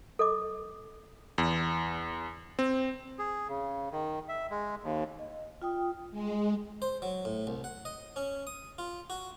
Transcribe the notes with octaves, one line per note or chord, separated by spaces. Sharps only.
A4 D#5 D6
E2
C4
G#4
C#3
D#3
E5
G#3
D#2
D#5
F4 G5 D#6
G#3
C5
F#3
A2
C2
F#5
D#5
C#4
D#6
F4
F#4